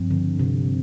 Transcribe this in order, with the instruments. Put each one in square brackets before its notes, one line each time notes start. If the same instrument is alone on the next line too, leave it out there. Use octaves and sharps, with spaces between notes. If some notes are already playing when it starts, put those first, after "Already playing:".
Already playing: [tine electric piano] G2 F3 C4
[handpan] D3
C3